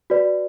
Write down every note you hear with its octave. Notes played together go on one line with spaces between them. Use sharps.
F#4 B4 D5